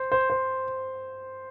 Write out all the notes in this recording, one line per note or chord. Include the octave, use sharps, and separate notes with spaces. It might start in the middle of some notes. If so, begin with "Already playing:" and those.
Already playing: C5
C5
C5